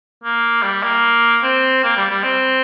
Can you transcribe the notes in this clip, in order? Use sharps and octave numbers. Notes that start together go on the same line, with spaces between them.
A#3
G3
A#3
C4
A#3
G3
G3
C4